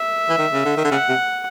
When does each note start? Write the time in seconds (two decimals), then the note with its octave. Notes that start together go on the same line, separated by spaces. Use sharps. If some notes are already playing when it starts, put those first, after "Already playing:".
Already playing: E5
0.29 E3
0.38 D#3
0.53 C#3
0.65 D3
0.77 D#3
0.84 D3
0.91 C#3 F#5
1.09 C3